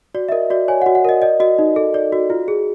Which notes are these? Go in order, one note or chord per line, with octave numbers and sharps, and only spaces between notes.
F#4 D5
E5
A#4 D#5
F#4 D5
C#5 G#5
F#5
F#4
F#5
A#4 D#5
D5 D#5
F#4 D#5
D#4
A4
D5
F#4
F4
G#4